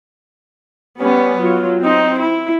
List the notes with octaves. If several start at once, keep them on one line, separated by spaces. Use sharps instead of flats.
G3 B3 C#4
F#3 F4
C4 D#4
E4